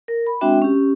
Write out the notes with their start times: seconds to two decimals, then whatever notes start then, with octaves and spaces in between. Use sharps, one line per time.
0.08 A#4
0.27 B5
0.41 G#3 C4 D4 F#4 E5 G5
0.62 C#4 G4